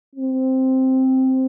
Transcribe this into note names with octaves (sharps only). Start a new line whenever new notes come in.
C4